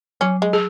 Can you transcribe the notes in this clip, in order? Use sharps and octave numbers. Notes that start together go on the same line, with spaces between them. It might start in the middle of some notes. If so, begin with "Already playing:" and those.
F#3 C#4
G#3
G#4